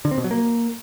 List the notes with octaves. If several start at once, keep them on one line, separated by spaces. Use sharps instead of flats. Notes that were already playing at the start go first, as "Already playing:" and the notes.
D3
C4
B2
F#3
A#3